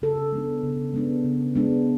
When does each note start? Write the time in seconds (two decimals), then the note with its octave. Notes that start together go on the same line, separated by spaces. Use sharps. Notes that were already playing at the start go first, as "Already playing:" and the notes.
0.02 C#3 A4
0.32 G#3 B3 D4
0.63 C#3
0.94 G#3 B3 D4
1.24 C#3
1.55 G#3 B3 D4